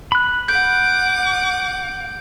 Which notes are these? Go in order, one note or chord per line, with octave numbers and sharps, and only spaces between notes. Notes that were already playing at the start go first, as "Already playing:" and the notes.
B5 F#6
F#5 D6 G6